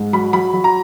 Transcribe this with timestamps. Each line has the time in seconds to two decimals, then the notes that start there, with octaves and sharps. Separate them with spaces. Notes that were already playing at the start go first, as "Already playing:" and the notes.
Already playing: G#2
0.13 F#3 B5
0.33 F#3 B5
0.53 F#3
0.64 A#5